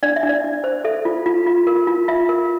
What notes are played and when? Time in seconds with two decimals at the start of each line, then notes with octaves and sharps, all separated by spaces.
0.03 D4 D5
0.16 E5
0.23 D4
0.29 D5
0.44 D4
0.64 C5
0.85 A4 E5
1.05 F4
1.26 F4
1.47 F4
1.67 A#4
1.87 F4
2.08 F4 E5
2.29 A#4